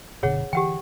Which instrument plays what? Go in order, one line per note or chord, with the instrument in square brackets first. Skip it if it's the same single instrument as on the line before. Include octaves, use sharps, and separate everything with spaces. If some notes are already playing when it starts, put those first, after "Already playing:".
[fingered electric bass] F#1 B2 D3 [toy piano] G#4 C#5 F#5
[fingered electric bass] D3 E3 [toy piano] G4 F#5 G5